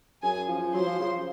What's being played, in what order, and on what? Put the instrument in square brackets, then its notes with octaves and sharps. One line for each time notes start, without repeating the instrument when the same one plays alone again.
[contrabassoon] F#2 [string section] G#4 G#5
[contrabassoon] F3
[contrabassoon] F#3 [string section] C5 C6
[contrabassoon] F3
C#3